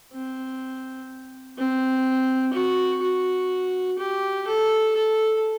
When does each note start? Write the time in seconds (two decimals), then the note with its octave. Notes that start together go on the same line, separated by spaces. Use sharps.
0.13 C4
1.58 C4
2.53 F#4
3.03 F#4
3.98 G4
4.46 A4
4.95 A4